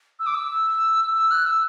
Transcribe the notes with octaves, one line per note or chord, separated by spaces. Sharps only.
E6
D6
E6
E6
F#6
E6